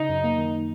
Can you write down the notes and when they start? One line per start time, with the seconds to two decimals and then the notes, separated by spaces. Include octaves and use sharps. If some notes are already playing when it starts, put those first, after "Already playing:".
Already playing: C#3 D#4
0.09 F#2
0.24 A#3
0.38 D#3